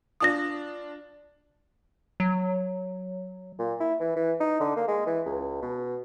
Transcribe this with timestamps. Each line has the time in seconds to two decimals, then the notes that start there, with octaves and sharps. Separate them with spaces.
0.20 D4 F4 D#6 A#6
2.20 F#3
3.59 A#2
3.80 E4
4.00 E3
4.16 E3
4.40 D#4
4.61 D3
4.76 A#3
4.88 G#3
5.06 E3
5.26 C#2
5.62 B2